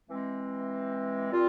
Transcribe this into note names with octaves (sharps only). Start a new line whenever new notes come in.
E3 G#3 C4
A#2 G3 C4 F4